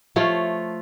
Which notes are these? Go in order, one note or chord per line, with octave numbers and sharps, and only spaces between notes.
F3 A3 F4 C#5